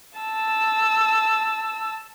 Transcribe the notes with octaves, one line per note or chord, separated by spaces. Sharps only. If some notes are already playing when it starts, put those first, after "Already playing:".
A5 E6